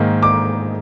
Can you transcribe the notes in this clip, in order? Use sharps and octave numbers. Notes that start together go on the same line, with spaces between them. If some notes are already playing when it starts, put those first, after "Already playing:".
Already playing: G#2 D#3 A#3
D6